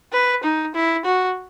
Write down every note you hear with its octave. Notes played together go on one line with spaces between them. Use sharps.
B4
D#4
E4
F#4